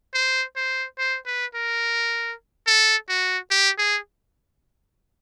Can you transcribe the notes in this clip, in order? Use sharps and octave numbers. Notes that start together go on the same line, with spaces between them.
C5
C5
C5
B4
A#4
A4
F#4
G4
G#4